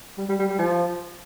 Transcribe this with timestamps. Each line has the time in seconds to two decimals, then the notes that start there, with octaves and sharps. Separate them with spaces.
0.18 G3
0.29 G3
0.39 G3
0.50 G3
0.59 F3